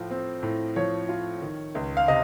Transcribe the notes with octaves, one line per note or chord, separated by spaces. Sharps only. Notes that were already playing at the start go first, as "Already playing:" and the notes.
Already playing: A2 F3 F4
C4
A2
F3 C#5
F4
D#3
C#2
F5
C3 D#5